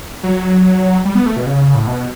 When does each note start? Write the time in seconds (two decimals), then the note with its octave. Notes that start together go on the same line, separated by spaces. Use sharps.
0.23 F#3
1.05 G3
1.15 B3
1.26 A3
1.36 B2
1.46 C#3
1.75 A2
1.87 B2